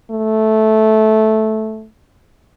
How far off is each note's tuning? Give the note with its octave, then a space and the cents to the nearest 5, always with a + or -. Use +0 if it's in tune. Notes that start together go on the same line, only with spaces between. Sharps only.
A3 -10